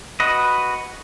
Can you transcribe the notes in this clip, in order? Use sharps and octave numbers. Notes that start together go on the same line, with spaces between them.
F#4 B4 D#5